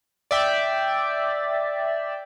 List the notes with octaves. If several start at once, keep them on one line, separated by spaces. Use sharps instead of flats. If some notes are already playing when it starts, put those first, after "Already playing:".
D5 E5 G5